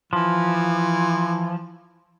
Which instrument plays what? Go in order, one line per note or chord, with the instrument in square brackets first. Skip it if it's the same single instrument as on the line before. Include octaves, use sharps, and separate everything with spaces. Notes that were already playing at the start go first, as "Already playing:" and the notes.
[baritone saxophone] E3 [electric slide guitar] F3